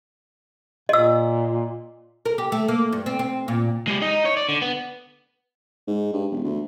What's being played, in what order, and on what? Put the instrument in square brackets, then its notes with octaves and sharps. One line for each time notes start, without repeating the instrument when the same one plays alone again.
[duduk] A#2 [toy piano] D#5 E6
[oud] A#4
G4
A3
A#3
G2
C4
C4
A#2
[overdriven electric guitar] G#3 G4
D#4 D#5
C#5
D5
D3
B3
[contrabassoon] G#2
G2
E1
D2